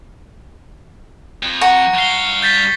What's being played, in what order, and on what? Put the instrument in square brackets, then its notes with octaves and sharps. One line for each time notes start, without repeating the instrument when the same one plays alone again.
[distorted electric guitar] F2
[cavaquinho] F#5 A#5 [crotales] C#6 C#7
[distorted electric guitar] G2 F5 [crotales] C7 G7
[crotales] G6 A6 B6